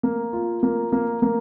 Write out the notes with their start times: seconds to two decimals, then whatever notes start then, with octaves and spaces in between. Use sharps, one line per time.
0.03 A#3
0.33 F4
0.63 A#3
0.92 A#3
1.22 A#3